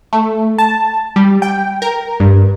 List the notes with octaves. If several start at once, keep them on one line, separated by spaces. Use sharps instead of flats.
A3
A5
G3
G5
A#4
G2